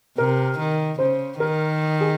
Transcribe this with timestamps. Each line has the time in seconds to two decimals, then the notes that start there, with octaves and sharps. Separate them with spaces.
0.18 C3 A#4
0.58 D#3
0.99 C#3 C5
1.39 D#3 A#4
2.01 G#4